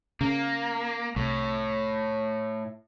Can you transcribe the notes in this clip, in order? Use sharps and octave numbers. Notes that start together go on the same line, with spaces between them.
C#3 A#3
C2 A2